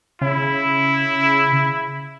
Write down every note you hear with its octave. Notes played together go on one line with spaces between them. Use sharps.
C#3 E4